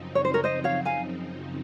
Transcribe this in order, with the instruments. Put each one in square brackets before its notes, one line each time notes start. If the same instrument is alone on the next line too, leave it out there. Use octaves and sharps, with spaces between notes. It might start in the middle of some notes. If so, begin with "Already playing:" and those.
Already playing: [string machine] F#2 C#3 F3 C4 D#4
[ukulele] C#5
C5
A#4 C#5
C5 D#5
C#5 F5
F5 G#5